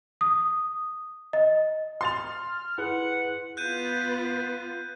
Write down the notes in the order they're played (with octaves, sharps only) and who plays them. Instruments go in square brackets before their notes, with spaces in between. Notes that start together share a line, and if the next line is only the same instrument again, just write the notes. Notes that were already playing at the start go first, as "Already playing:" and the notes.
[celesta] D#6
D#5
[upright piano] C6 A6 F7 [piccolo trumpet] F6
[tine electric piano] E4 G#4 B4 [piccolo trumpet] F#5
[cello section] B3 F4 B4 [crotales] F#6 G6 D#7